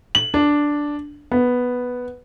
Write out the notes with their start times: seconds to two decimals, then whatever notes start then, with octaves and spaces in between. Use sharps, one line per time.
0.15 F#7
0.34 D4
1.32 B3